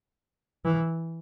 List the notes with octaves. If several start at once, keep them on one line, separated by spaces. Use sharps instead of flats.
E3